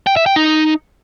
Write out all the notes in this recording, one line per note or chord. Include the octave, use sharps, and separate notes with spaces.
G5
E5
G5
D#4